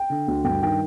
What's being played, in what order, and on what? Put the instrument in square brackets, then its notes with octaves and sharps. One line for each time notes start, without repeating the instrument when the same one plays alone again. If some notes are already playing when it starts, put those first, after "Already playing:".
Already playing: [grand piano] G5
D3
D2
G2 G5
D#3 G5